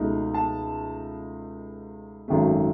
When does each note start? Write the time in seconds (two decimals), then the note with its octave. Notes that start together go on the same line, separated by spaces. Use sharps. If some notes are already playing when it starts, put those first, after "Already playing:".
Already playing: C#2 B2 A3 D#4
0.34 A5
2.28 G#1 F#2 D#3 A3